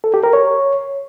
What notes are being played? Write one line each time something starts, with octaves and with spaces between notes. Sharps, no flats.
A4
G4
A#4
C#5